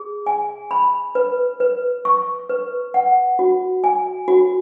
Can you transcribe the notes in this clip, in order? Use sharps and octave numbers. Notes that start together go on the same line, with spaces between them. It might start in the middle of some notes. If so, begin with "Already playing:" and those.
Already playing: G#4
G#5
B5
B4
B4
C#6
B4
F#5
F#4
G#5
F#4